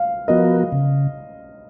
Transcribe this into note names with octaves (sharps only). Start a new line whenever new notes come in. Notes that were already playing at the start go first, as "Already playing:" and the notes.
Already playing: F5
F3 B3 F#4 A#4 D#5
C#3